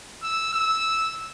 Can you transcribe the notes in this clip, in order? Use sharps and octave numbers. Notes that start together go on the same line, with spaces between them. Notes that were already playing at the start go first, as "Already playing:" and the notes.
E6
E6